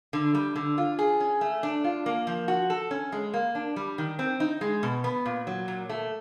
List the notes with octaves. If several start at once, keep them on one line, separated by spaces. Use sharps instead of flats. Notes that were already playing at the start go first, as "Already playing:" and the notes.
D3
G3
D3
F4
G#4
C#4
A3
D4
F4
A#3
F3
F#4
A4
C#4
G#3
A#3
D4
G3
D#3
C4
D#4
G#3
B2
B3
A#2
F#3
A#2
A3